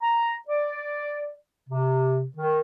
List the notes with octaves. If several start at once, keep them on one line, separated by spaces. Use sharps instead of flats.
A#5
D5
C3
D#3